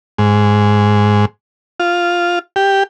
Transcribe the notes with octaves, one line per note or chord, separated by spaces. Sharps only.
G#2
F4
G4